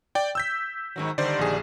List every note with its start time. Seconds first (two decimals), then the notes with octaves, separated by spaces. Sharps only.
0.15 D5 G5
0.35 E6 G6 B6
0.96 G#2 D#3 F#3
1.18 D3 D#3 G3 C5 D5
1.39 A#1 G#4